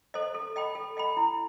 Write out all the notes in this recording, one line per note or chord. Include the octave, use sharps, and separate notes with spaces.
A4 C5 D#5
A4
D#5 G5 B5
A4
D#5 G5 B5
E4